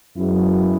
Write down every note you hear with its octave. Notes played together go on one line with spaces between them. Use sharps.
F#2 G#3 B3 E4 G#4